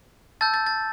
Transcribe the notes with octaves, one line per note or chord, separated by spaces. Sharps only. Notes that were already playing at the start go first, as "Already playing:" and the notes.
A5 E6 G6 A6
A6
A6